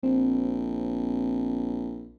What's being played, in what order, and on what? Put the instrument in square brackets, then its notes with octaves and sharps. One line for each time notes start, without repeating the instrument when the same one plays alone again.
[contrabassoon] A#1 [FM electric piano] C4